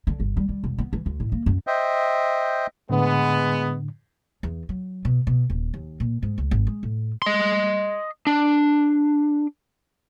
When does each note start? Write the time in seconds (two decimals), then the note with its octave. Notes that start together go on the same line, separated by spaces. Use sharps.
0.07 D3
0.20 G1
0.37 G3
0.49 G3
0.64 E1
0.78 B3
0.93 E3
1.06 D2
1.20 A2
1.32 A#3
1.46 F#2
1.67 C5 D#5 E5 G5
2.90 A2 D3 G#3 B3
4.43 E2
4.69 F#3
5.05 B2
5.27 B2
5.50 D#1
5.74 D#2
6.00 A#2
6.23 G#2
6.38 C#2
6.51 G#1
6.67 G#3
6.83 A2
7.22 D#5 C6
8.27 D4